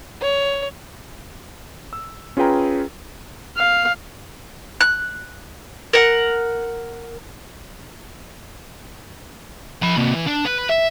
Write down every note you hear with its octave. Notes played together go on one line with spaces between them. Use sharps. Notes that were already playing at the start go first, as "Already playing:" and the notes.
C#5
E6
C#4 F4 G#4 B4 G5 A#5
F5
F#6
A#4 F#5
F3 B5
C3 A#3
E3
D4
B4
E5